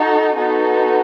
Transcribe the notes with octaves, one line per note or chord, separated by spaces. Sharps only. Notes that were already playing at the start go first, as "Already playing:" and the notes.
Already playing: D#4 F#4 A4
B3 D#4 F#4 A4